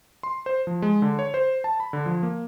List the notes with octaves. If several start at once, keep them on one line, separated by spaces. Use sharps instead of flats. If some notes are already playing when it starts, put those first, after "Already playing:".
C6
C5
F3
G#3
D3
C#5
C5
A5
B5
D3
F3
A#3